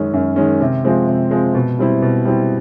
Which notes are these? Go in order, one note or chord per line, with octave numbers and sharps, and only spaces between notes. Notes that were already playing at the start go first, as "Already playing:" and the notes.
Already playing: F#2 D#3 G#3 C#4
F#2
D#3 G#3 C#4
C3
F3 G#3 C4
C3
F3 G#3 C4
B2
G3 C4 E4
B2
G3 C4 E4